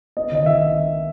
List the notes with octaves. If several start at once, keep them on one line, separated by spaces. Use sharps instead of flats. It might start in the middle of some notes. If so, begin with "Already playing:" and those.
B3 D#5
D#3 D#5
D#3 E5